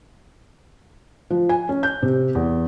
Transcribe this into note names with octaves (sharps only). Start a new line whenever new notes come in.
F3
G#5
C#4
G6
C3
E2